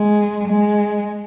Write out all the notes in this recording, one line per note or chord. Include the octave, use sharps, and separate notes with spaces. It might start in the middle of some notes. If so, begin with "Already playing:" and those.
Already playing: G#3
G#3